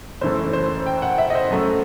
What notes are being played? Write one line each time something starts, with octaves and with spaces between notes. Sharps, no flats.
F#1 F#2 E3 A3 C5
C5
G5
F#5
E5
D#5
C5
F#2 F#3 A3